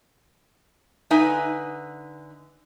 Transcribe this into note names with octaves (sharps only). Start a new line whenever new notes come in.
D3 D#4 B4 E5 G#5